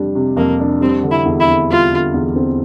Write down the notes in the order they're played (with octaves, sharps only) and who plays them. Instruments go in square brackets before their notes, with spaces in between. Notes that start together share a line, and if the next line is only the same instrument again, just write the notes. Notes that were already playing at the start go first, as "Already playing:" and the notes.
Already playing: [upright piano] F2 C3 G3 D4
C3
[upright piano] F2 [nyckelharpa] A#3
[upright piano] D4
[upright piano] G3 [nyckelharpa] C4
[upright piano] D3
[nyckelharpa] E4
[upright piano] E2
[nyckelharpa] E4
[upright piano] C4
[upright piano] G3 [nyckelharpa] F4
[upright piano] D3
E2
C4